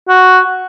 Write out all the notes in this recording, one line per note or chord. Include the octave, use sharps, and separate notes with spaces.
F#4